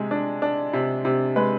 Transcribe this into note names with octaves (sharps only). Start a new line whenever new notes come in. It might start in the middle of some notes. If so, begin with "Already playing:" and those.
Already playing: C3 G#3
D4
D4
C3
C3
G#3 B4